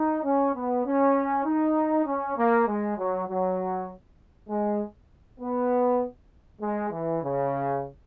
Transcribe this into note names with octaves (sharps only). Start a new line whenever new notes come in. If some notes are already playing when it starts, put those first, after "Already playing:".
Already playing: D#4
C#4
B3
C#4
D#4
C#4
A#3
G#3
F#3
F#3
G#3
B3
G#3
E3
C#3